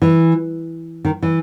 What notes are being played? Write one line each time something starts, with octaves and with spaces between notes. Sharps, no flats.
E3
D#3
E3